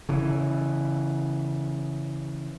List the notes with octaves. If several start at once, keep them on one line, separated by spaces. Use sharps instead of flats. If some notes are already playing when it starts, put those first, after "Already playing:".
C#3 E3